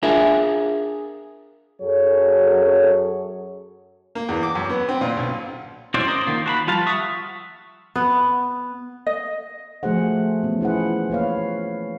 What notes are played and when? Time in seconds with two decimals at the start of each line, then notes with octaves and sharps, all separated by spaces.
0.03 D4 F4 G#4 A#4 E5
1.82 F#2 F#3 G#4 A4 C#5
4.15 A#3
4.29 E2
4.43 D6
4.55 F#2
4.70 B3
4.89 C4
5.01 A#2
5.17 B1
5.94 C#4 E4 F#4 C5 D5
6.08 A#4 C5 D5 D#5
6.27 D#3 A#3 F4
6.46 F#4 A5 B5
6.67 F3 G3 F4 F5 A5
6.86 E5 F#5 C#6 D#6
7.96 B3
9.07 D#5
9.83 F3 A3 F#4 G#4 C5 F#5
10.43 E3 B3 C#4
10.61 E4 F4 G#4 B4 C5 F#5
10.80 E4
11.10 A#3 B4 C#5 F5